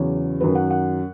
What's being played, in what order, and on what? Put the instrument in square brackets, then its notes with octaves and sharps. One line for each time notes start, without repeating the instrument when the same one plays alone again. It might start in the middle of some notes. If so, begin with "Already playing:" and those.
Already playing: [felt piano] E2 C#3 F#3 C#5
F#2 D#3 F#3 B4
F#5
F#5